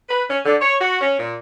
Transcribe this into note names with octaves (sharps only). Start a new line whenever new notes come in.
B4
C#4
D3
C#5
F#4
C#4
A#2